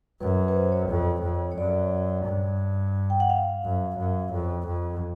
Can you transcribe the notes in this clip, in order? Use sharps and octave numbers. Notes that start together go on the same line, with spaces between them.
F#2 B4
B4
C5
C#5
F2
F2
C#5
F#2 D5
G2
G5
F#5
F5
F#2
F#2
F2
F2